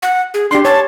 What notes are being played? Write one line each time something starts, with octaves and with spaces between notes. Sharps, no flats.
F#5
G#4
D4 G4 C6
C#5 A5